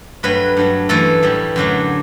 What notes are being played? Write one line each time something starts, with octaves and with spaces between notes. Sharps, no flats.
G2 F#3 A3 B4
G2 F#3 A3
F#2 E3 A3 A4
A2 E3 G3
F#2 D3 F#3 A3